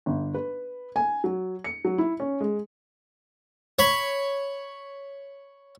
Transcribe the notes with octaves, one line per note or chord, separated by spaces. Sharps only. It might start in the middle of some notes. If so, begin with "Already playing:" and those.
G1
B4
G#5
F#3
C#7
F#3
E4
C#4
G#3
C#5 B5 C#6